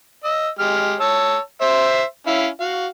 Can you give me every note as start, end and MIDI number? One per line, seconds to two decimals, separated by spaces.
0.24 0.49 75
0.24 0.49 88
0.59 0.95 56
0.59 0.95 67
0.59 0.95 89
1.00 1.38 73
1.00 1.38 81
1.00 1.38 88
1.61 2.03 72
1.61 2.03 76
2.27 2.47 61
2.27 2.47 64
2.27 2.47 77
2.60 2.87 66
2.60 2.87 77